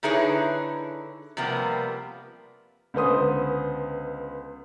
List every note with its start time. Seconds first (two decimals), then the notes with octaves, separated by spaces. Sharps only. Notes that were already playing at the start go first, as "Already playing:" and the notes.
0.03 D3 D#4 E4 G#4 B4 C#5
1.37 C3 F3 G3 A#3 B3
2.94 C#2 D3 B3 C5 D#6